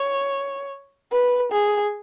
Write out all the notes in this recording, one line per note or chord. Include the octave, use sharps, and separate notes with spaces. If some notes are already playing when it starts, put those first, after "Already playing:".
Already playing: C#5
B4
G#4